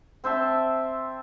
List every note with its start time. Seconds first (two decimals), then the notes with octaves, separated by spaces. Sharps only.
0.24 C4 C5 E5 A5